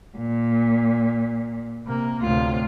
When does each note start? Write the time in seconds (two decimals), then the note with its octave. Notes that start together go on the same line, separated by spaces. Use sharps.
0.17 A#2
1.86 C3 A#3
2.22 D2 A2 C3 F4